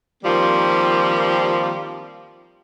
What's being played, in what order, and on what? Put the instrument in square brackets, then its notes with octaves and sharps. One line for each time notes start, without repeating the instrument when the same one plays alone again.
[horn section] D#3 F3 G3 A#3 C4